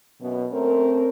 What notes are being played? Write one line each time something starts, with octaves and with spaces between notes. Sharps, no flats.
F#2 B2
A3 C4 C#4 A#4